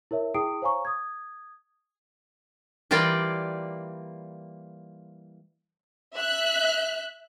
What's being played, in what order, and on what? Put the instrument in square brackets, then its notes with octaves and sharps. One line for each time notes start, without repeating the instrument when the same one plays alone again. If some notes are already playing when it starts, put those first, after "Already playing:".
[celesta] E4 A#4 C#5 E5
E4 G#4 G5 D#6 C7 D7
C5 C#5 F5 G#5 A#5 C#6
D#6 G#6
[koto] E3 G3 A#3 F4 D5 G5
[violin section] E5 F#6